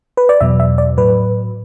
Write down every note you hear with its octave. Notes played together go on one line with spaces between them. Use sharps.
B4
D5
E2 B2 F#3 E5
E5
D5
A2 F#3 B4